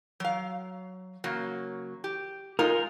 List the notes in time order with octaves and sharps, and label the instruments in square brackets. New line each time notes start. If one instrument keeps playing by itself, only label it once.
[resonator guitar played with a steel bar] F#3 F5
C#3 F#3 A#3
G4
[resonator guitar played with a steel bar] G#3 D#4 F4 [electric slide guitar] A#4